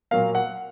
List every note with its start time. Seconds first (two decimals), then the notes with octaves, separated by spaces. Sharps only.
0.11 A#2 F#3 A#3 F5
0.35 F#5